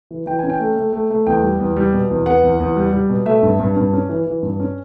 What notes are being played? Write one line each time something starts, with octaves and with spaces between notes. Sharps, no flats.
E3
E3 G5
C#4 G#5
G5
A3
A3
A3
A3
E2 G5
G3
E2
G3
B2
E2
B3 F#5
E2
E2
G3
G3
B2
A3 E5
G2
G2
G2
C#4
E3
E3
G2
C#4